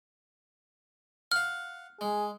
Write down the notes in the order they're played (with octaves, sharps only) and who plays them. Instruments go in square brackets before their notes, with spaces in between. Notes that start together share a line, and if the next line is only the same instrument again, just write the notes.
[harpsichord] F5 F#5 [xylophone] F6
[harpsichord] G#3 [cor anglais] G#4